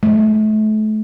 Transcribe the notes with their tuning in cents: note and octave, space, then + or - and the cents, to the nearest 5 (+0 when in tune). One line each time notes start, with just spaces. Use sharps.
A3 -35